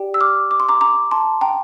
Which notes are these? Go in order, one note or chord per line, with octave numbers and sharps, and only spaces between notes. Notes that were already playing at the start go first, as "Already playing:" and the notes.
Already playing: G4 D5 G5
E6
D6 F6
D6
C6
A#5 D6
A#5 D6
A5 C6
G5 A#5